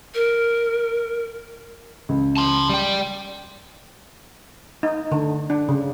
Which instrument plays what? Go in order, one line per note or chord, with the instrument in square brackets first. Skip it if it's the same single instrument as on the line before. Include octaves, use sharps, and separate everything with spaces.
[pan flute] A#4
[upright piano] C#2
[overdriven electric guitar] A5 C6
G3 G5
[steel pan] D#4
D3
D4
C#3